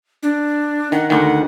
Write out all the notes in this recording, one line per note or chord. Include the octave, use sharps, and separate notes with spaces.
D4
D#3 F#5
D2 D#3 F#5